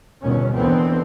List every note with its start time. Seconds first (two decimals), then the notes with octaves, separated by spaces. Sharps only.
0.23 G1 D#2 B2 C#4
0.56 D#2 D3 E3 B3 C4